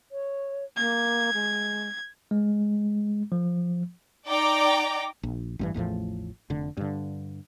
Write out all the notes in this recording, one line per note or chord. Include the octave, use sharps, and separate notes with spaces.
C#5
A#3 G#6
G#3
G#3
F3
D#4 D5 G5 A#5 D6
A#1
A1 G2 E3
A1 E2 A2 F3
F1 D3
G2 D3